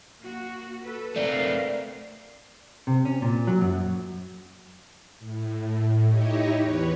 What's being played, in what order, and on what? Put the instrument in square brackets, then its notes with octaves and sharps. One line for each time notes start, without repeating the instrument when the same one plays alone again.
[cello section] A#3 F#4
A4 B4
[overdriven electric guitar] A3 C4 [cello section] A#4 B4 F5 [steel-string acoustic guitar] D5
[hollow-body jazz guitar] C3
C#4
A#2
F#3
F#2
[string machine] A2
D#4 E4 G4 C#5 D#5
E2 B4 C#5